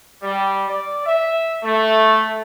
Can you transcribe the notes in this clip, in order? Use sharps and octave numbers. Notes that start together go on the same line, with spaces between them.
G3
D5
E5
A3